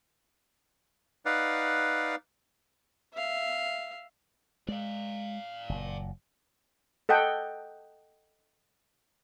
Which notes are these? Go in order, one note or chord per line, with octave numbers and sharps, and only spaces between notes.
D#4 B4 D5 F5 F#5
E5 F5
G#3 D5 F5
F#1 A#2
A4 D#5 F#5 G5